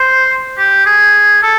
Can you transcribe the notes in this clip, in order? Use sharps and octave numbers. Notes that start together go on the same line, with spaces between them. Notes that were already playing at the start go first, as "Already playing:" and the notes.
Already playing: C5
G4
G#4
A4